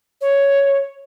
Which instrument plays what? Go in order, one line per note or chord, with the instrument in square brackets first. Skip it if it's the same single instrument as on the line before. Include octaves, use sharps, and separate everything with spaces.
[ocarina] C#5